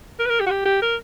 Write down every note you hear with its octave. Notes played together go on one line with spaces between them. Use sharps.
A#4
B4
A#4
G4
F#4
G4
G4
A#4